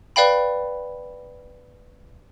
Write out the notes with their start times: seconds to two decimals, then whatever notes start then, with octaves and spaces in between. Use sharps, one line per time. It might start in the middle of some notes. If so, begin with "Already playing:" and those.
0.16 B4 D5 F5 G5 B5